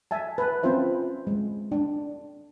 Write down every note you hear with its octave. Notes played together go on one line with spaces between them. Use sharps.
E5 G#5 A5
B4 A5
C4 C#4 F4 C5 E5
G#3
D4